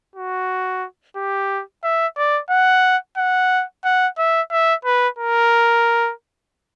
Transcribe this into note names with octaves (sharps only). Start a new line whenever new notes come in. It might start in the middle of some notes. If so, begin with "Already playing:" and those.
F#4
G4
E5
D5
F#5
F#5
F#5
E5
E5
B4
A#4